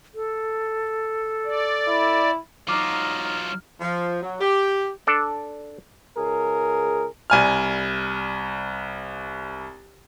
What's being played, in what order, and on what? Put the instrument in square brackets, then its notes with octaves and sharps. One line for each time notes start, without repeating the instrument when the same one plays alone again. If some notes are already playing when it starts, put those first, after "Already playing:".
[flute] A4
[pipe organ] D5
[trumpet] E4
[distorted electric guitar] F#3 F4 [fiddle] D#4 [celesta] D6 [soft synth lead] F6
[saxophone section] F3
F#3
G4
[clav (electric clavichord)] D4 A4 D5
[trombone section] C#2 G#4 A#4
[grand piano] C2 G#5 F6